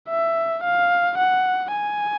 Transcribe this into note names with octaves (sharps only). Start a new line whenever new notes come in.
E5
F5
F#5
G#5